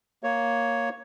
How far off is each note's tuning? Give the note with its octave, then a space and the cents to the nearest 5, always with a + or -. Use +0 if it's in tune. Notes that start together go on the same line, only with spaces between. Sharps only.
A#3 +0 C#5 +0